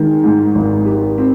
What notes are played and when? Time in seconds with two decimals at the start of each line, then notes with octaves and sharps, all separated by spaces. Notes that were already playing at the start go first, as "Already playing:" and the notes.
Already playing: D#3 G#3
0.24 G#2
0.55 G#1
0.86 G4
1.18 C4